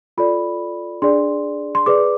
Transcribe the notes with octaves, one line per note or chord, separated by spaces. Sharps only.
F4 A4 D5 B5
D4 G#4 D5 C6
C6
G#4 B4 D5 D6